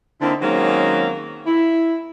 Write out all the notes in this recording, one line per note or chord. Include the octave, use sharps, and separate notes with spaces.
D3 A#3 C4 D#4 E4
D#3 F#3 G#3 A#3 C4 C#4
E4